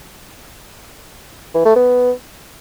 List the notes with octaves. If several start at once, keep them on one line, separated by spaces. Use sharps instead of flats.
E3
A3
B3